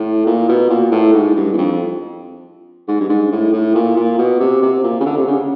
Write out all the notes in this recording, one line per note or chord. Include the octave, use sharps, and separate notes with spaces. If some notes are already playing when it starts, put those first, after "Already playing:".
Already playing: A2
A#2
B2
A#2
A2
G#2
G2
E2
F2
G#2
G2
G#2
A2
A2
A#2
A#2
B2
C3
C3
A#2
C#3
D3
C3
C#3